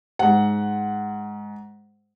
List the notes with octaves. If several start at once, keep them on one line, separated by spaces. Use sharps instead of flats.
G#2 F#5